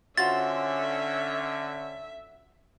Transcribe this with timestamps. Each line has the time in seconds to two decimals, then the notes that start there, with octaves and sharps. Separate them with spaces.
0.17 D3 C#4 F4 F#4 C5 E5 A6